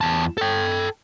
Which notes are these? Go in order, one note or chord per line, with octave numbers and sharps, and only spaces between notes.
E2 A5
A4 G5